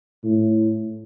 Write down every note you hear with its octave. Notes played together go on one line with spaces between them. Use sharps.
A2